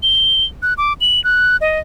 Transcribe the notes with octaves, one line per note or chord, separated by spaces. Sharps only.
G7
F#6
D6
F#7
F#6
D#5